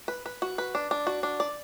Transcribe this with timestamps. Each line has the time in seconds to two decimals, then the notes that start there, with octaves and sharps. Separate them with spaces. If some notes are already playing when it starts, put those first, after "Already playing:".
0.08 B4
0.26 B4
0.42 F#4
0.58 B4
0.75 D4
0.91 D4
1.07 F#4
1.23 D4
1.40 D5